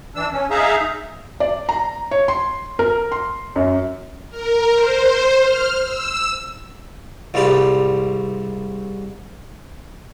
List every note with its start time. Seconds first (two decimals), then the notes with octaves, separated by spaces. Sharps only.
0.15 E3 D4 E6
0.31 C#4
0.50 D#4 G#4 E5 F5 A#5
1.40 D5
1.69 A#5
2.11 C#5
2.28 C6
2.79 A#4
3.12 C6
3.56 F#2
4.30 A#4
4.73 C5
5.40 F6
5.82 E6
7.34 C2 G#2 G3 F4 G4